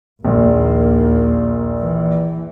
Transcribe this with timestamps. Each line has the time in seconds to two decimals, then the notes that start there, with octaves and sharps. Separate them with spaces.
0.25 A#1 D#2 A#2 A#3
1.81 E3